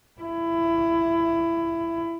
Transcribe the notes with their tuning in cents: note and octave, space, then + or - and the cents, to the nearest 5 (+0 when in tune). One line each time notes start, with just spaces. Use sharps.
E4 +20